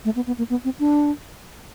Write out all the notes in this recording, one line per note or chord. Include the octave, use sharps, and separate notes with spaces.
A3
B3
B3
A#3
B3
C4
D4